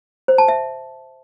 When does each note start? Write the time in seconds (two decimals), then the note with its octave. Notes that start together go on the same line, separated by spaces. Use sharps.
0.28 C5
0.38 A5
0.48 E5